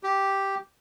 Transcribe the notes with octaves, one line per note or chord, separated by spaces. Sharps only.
G4